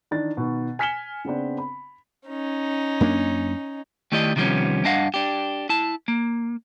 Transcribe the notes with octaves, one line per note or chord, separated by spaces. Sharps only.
D#3 E3 D4 A6
B2 D#3
G#5 F6 B6 C#7 E7 G7
C#3 B3 C4 D4
B5
C#4 D#4
F#2 A#3 D4
D#3 A3 E4 G4 D5 D#5
C3 D#3 F3 G3 B3 C#4
G2 D4 D#5 F5 F#5
D4 G4
E4 A5
A#3